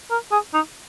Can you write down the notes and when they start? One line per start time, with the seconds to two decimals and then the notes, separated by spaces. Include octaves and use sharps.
0.11 A#4
0.32 G#4
0.54 D#4